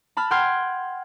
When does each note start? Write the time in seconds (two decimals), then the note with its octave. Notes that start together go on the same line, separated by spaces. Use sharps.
0.17 A5 B5 F6
0.31 F#5 G5 C6 F6 G#6 C7